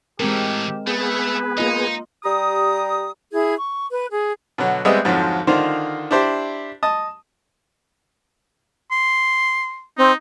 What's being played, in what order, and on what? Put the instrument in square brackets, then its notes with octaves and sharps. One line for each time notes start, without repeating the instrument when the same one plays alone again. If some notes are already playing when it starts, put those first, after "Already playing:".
[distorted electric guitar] A2 E3 [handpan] G#3 C4 A#4 [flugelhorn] G4
[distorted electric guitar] A3 [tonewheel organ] B3 G#4 [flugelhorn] B4
[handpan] A#3 F4 D#5 [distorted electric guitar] D#4
[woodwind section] G3 G4 A#5 D#6
[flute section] E4 G#4 G#6
C#6
B4
G#4
[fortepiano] B2 D3 F#3
G3 G#3 B3 C4 D#5 E5
F2 G#2 D3 F3 F#3 C4
D3 D#3 D4 D#4 F4 C5
D4 E4 G4 C5 D5
D#5 A5 D#6
[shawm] C6
[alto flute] C4 [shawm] D#4